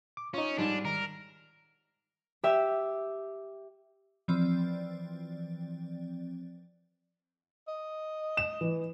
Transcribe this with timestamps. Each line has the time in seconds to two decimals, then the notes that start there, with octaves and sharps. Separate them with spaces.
0.17 D6
0.34 C#4 D#4 F4
0.58 G#2 G3 D4
0.85 D#3 A#4
2.44 G4 E5
4.28 E3 F3 C4 D5
7.68 D#5
8.37 E7
8.61 E3